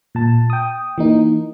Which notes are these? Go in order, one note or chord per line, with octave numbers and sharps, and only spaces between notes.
A#2 A5
G5 D#6
E3 A#3 D#4